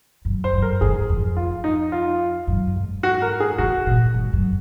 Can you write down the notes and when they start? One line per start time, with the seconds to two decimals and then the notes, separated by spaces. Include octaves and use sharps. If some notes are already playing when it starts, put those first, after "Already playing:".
0.25 F#2
0.44 C5
0.53 F#2
0.62 A#4
0.81 G#2 G#4
1.09 F2
1.37 F4
1.64 D#4
1.92 F4
2.47 F#2
2.76 G#2
3.03 F#4
3.22 A#4
3.40 G#4
3.58 C3 F#4
3.86 A#2
4.14 G#2
4.33 F#2